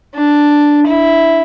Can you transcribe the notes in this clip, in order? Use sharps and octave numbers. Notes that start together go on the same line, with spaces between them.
D4
E4